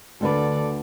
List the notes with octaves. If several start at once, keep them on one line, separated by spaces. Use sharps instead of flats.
D2 D3 D4 A4 B4 D5